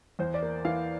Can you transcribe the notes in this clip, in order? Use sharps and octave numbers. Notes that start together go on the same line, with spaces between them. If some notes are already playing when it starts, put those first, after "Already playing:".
E2 C5
D5
A#3
E3 F5